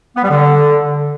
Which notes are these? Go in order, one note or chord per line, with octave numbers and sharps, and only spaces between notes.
B3
G3
D3